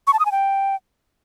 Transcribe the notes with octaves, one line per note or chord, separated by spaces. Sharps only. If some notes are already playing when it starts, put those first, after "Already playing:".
C#6
A5
D#6
G#5
G5